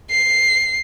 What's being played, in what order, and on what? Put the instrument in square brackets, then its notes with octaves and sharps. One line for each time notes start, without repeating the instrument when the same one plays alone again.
[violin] C7